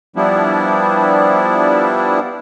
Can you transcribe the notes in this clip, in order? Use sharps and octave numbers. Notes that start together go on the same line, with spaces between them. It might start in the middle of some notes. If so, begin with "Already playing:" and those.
F3 G3 B3 D4 E4